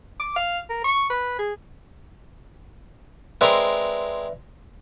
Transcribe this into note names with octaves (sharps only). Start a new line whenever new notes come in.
D6
F5
A#4
C#6
B4
G#4
G#3 C4 A#4 B4 D5 E5